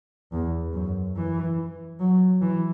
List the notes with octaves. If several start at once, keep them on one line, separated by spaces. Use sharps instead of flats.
E2
F#2
E3
F#3
E3